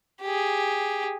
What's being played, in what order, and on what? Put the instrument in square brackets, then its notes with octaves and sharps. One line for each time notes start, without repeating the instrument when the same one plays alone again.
[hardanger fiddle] G4 G#4